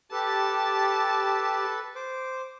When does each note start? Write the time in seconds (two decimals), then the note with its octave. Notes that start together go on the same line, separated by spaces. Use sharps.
0.12 G4 A4 B4 A5
1.95 C5 D6